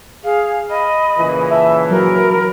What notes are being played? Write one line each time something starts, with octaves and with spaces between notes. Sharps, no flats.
G#4 F5
D#5 B5
A#2 C#3 E3
E5 A5
F#3 A#4 B5